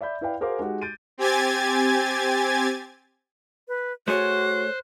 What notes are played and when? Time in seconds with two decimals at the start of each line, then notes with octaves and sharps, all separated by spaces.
0.01 D5 E5 B5 G6
0.21 E4 B4 D5 F5 G5
0.41 F#4 G#4 A#4 C5 F5 D6
0.59 G#3 D#4 F#4 G4
0.82 G6 A6 D7 D#7
1.18 C4 G4 G#5 G#6 A6
3.68 B4
4.08 A3 F#4 G#4 C5 C#5 F#6